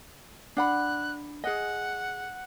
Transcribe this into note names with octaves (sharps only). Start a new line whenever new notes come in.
D4 F#5 B5 F#6
G#4 D#5 F#5